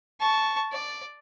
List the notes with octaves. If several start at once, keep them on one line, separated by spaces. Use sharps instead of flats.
A5 C#6
D5